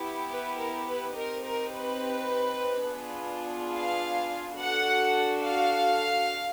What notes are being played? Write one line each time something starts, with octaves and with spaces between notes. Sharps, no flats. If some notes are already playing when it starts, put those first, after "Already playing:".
Already playing: B3 E4 G4
B4
A#4
B4
C4 D#4 G4 A#4
A#4
B4
B3 D4 F4 G#4
F5
D4 F#4 A4 F#5
F5